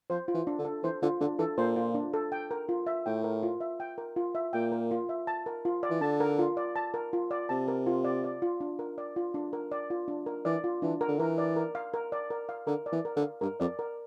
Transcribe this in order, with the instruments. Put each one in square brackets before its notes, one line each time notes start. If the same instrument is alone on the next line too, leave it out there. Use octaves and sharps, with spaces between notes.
[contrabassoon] F3 [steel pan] C5
[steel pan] F4
[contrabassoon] E3
[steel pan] D4
[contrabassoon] D3
[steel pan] A4
[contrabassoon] E3 [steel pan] C5
[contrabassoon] D3 [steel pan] F4
[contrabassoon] D3 [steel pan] D4
[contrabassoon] E3 [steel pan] A4
[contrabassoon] A#2 [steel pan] C5
[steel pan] F4
D4
A4
G5
A#4
F4
E5
[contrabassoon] A2 [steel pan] G5
[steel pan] A#4
F4
E5
G5
A#4
F4
E5
[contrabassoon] A#2 [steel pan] G5
[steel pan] A#4
F4
E5
A5
A#4
F4
D5
[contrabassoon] E3
[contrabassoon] D3 [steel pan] A5
[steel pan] A#4
F4
D5
A5
A#4
F4
D5
[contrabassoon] C3 [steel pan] A5
[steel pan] A#4
F4
D5
D5
F4
D4
A#4
D5
F4
D4
A#4
D5
F4
D4
A#4
[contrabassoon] E3 [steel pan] D5
[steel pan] F4
[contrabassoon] E3 [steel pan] D4
[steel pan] A#4
[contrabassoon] D3
[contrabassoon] E3 [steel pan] A#4
[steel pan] D5
A#4
F5
A#4
D5
A#4
F5
[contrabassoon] D3 [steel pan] A#4
[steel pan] D5
[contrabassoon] E3
[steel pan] A#4
[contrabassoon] D3
[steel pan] F5
[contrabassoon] G2 [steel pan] A#4
[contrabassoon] F2 [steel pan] D5
[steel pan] A#4